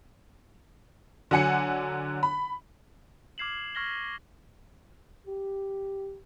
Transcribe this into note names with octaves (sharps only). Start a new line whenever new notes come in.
D3 F#3 F#5 G#5 C#7
B5
D6 F6 G#6 C7 E7 F#7
C#6 F6 G#6 A#6 B6 G7
G4